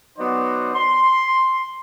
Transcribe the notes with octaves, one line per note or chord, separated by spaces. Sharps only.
F#3 B3 D#4 F#4 C5 D5
C6